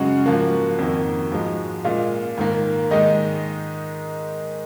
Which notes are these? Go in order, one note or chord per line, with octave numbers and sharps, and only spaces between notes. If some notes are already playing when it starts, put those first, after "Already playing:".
Already playing: F#2 C#3 G#3 F#4 F#5
G#2 F3 A#3
F2 D#3 A#3
G#2 F3 G#3
A#2 G#3 F4 F5
G#2 D#3 A#3
G#2 D#3 G#3 D#4 D#5